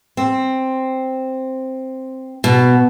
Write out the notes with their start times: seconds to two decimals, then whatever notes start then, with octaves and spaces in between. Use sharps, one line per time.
0.17 C4
2.44 B2